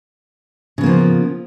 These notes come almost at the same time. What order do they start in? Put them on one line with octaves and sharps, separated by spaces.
C#3 B3 A#3 F3